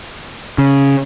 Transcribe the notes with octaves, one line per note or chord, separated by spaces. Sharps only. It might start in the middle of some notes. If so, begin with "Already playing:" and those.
C#3